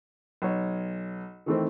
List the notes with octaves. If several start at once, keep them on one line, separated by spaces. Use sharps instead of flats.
B1 C#5
D#3 E3 A3 C4